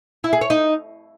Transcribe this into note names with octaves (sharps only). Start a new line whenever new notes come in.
E4
G#4
C#5
D#4